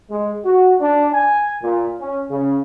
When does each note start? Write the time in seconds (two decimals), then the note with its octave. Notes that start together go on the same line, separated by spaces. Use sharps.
0.10 G#3
0.45 F#4
0.80 D4
1.13 G#5
1.63 A#2
2.00 C#4
2.30 C#3